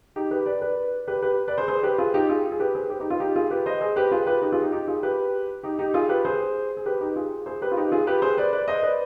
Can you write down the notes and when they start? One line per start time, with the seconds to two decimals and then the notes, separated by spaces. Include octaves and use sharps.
0.16 D#4 G4
0.31 G4 B4
0.46 B4 D5
0.61 B4 D5
1.07 G4 B4
1.22 G4 B4
1.48 B4 D5
1.58 G#4 C5
1.68 G#4 C5
1.83 G4 B4
1.98 F4 G#4
2.14 D#4 G4
2.29 F4 G#4
2.52 G#4
2.60 G4 B4
2.75 G#4 C5
2.90 G4 B4
3.00 D#4 G4
3.10 F4
3.20 D#4 G4
3.36 F4 G#4
3.51 G4 B4
3.66 C5 D#5
3.81 G#4 C5
3.96 G4 B4
4.12 F4 G#4
4.27 G4 B4
4.42 D#4 G4
4.52 F4 G#4
4.62 D#4 G4
4.72 D#4 G4
4.88 F4 G#4
5.03 G4 B4
5.63 D#4 G4
5.79 D#4 G4
5.94 F4 G#4
6.09 G4 B4
6.25 G#4 C5
6.77 G#4
6.86 G4 B4
7.01 D#4 G4
7.16 F4 G#4
7.46 G#4 C5
7.62 G4 B4
7.72 F4
7.77 D#4 G4
7.92 F4 G#4
8.07 G4 B4
8.22 G#4 C5
8.38 B4 D5
8.53 B4 D5
8.68 C5 D#5
8.83 B4 D5